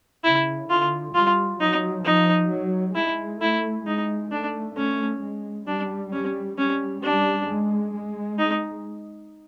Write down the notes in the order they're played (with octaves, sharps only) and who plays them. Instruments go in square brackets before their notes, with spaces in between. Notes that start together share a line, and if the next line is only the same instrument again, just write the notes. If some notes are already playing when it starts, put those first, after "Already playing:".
[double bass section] C#3 [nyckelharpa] E4
[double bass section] D3 [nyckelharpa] F4
[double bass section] G3 [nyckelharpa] F4
[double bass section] F#3 [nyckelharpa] D#4
[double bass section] F3 [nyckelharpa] D#4
[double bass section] F#3
[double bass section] G#3 [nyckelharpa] E4
[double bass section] A3 [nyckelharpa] E4
[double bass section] G#3 [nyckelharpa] D#4
[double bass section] A3 [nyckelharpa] D4
[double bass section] A3 [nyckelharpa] C#4
[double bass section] G#3
[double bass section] G3 [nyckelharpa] D4
[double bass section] G3 [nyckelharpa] C#4
[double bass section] G3 [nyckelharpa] C#4
[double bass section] G3 [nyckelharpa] D4
[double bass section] G#3
G#3
[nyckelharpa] D#4